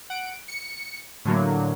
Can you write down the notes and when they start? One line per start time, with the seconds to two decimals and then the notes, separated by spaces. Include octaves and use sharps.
0.10 F#5 D7
0.48 C#7
1.25 A2 D3 F#3 A#3